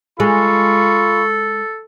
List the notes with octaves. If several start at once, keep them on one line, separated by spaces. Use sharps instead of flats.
G#3 F4 A4 B5 C#6